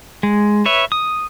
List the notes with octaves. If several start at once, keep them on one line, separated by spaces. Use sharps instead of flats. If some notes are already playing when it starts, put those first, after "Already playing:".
G#3
B4 C#5 E5
D#6